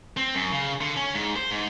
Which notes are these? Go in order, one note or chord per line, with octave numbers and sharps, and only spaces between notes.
C4
F#2
C#3
D3
C#4
G#2
C5
G#2